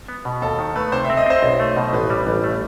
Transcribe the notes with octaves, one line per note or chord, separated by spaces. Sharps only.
B3
B2
D#2 A4
D#3
A3 B4
C3 C5
E5
C4
D#5
C4 C5
B1
A3
B2
A1 B4
G3
A1
A3